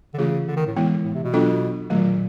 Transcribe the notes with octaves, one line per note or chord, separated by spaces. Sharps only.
D3
C#3 E3 A3 C#4 F4 G#4
D3
D#3
A2
E3 G#3 B3 E4
A2
C3
B2
F#3 B3 D4 F4 A4
A#2 D#3 F#3 A3